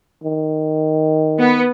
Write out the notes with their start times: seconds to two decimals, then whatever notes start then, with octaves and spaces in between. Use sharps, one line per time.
0.23 D#3
1.39 B3